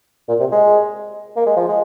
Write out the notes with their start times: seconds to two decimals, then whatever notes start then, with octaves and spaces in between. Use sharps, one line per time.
0.29 A#2
0.40 C3
0.52 G#3
1.37 A#3
1.46 G#3
1.57 F3
1.68 G#3